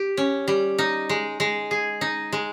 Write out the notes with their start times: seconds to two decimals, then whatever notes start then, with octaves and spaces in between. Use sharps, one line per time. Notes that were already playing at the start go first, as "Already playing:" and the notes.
Already playing: G4
0.17 C#4
0.48 G3
0.79 D#4
1.09 G#3
1.40 G#3
1.71 G#4
2.01 D#4
2.32 G#3